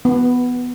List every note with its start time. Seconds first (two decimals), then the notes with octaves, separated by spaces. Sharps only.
0.05 B3